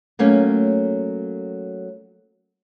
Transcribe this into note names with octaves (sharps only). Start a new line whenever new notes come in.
F#3 A3 A#3 C#4